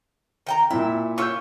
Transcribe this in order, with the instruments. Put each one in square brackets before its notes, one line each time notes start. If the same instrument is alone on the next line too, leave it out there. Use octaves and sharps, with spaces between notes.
[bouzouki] D#3 G5 A#5
[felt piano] A#2 E4 [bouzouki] E5
[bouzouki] F4 C#5 [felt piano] C#6 E6 G6